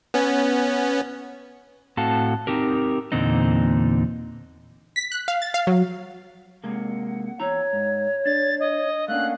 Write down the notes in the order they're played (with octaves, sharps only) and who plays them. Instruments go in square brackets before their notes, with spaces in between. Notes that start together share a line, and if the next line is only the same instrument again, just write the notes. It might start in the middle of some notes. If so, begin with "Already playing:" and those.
[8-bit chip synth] B3 C#4
[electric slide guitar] A2 C4 F#4 A4 F5 A5
C4 D#4 G4 A#4
E2 A#2 D3 C4 D#4
[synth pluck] B6
F#6
F5
A6
F5
F#3
[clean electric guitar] C3 G#3 A#3 [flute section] F#5
[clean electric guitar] E2 E4 A#5 [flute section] C#5
[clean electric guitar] G#2
[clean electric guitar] D4 [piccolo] A6
[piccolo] D#5
[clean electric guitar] A3 A#3 D4 [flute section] C#4 F5 F#5 [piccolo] F#6